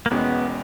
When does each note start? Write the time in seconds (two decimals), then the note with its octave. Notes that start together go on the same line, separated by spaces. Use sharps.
0.06 A#3
0.11 E1 E2 B2 G#3 B3 C#4